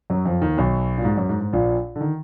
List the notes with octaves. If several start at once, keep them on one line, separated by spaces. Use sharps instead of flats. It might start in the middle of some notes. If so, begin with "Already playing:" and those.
F#2 F#3
F2 F3
D#2 D#3
B1 B2
A#2
G#2
F#2
G#2
G#2
A#1 A#2
D3
D#3